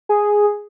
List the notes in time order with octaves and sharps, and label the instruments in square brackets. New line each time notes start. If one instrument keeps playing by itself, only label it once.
[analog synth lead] G#4